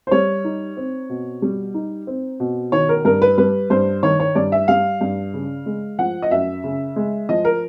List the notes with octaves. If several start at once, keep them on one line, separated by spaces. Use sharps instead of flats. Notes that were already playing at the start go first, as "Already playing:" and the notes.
C5
G3 C#5
D#4
C4
B2
G3
D#4
C4
B2
D#3 C#5
A#4
G2 A#4
B4
G3 B4
G2 C5
D#3 C#5
C#5
G2 D5
E5
G3 F5
G2
C#3
G#3
F3 F#5
D#5
F#2 E5
C#3
G#3
F3 D#5
A#4